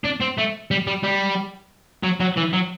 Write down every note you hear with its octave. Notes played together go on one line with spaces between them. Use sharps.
D4
C4
A3
G3
G3
G3
F#3
F#3
E3
F#3